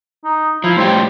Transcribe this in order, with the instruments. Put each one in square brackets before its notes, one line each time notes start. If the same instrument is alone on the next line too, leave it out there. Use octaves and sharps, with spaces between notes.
[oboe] D#4
[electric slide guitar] F3 [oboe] E4
[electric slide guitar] A2 G3 G4 [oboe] C5